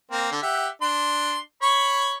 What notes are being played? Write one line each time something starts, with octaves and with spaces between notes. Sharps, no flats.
A#3 C4
D3
G4 E5 F#5
D4 C6
C#5 B5 C#6